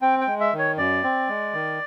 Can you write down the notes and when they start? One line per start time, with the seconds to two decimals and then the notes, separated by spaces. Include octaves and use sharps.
0.02 C4 G5
0.21 G5
0.27 G#3
0.40 E5
0.53 D#3
0.58 C#5
0.78 F#2 D5
1.03 C4
1.28 G#3
1.54 D#3